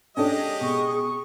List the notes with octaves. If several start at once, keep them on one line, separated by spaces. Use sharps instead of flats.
G#3 C#4 D4 G4 A4 D#5
B2 G#4 C#6